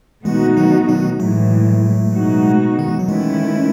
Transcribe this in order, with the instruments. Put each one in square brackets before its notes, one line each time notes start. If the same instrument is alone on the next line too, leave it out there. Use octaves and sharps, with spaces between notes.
[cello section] B2 A3 D#4 F#4 [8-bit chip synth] E3 G#3
[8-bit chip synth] D#3 F#3
D#3 F#3
[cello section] A2 E3 G#3 [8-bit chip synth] F#3 A3
[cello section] B2 G#3 D#4 F#4
[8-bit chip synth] D#3
E3
F#3
[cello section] D#3 A3 C#4 E4 [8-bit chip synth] E3 G#3